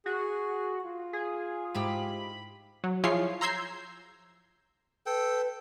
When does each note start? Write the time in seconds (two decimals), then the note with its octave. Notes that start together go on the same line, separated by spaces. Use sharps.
0.06 F#4 G#4
0.84 F4
1.13 G#4
1.74 G#2 E4 G4 B5
2.84 F#3
3.04 F3 E4 F4 G#4 C#5 C7
3.41 A#5 C6 E6 G6 G#6 C7
5.06 A4 B4 G5